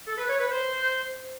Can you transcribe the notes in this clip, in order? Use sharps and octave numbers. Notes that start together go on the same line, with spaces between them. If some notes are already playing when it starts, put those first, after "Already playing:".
A4
B4
C#5
B4
C5